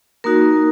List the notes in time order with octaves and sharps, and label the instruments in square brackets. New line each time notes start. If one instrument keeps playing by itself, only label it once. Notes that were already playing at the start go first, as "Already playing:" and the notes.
[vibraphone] A#3 D#4 F#4 A#4